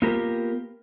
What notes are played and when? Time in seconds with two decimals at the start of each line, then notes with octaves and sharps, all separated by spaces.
0.02 A#3 B3 F4 G4 A#4